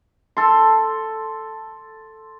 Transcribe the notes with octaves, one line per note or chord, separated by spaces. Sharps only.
A4 C6